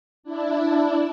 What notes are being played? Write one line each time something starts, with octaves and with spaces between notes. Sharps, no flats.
D4 E4